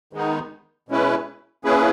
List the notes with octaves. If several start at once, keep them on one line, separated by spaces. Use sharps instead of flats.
D#3 G#3 B3 D#4
B2 G#3 C#4 E4 B4
A#3 C#4 E4 G#4 B4